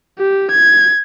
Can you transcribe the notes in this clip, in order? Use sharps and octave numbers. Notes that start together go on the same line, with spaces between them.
G4
G#6